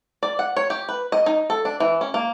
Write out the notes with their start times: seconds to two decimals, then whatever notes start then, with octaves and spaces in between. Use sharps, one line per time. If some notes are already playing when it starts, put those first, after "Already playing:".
0.23 D5
0.39 F#5
0.56 C#5
0.70 G4
0.89 B4
1.12 D#5
1.26 D#4
1.50 A4
1.65 D4
1.80 E3
2.01 C#4
2.14 A#3